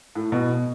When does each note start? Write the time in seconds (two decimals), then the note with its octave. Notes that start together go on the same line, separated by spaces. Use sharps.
0.15 A2
0.32 B2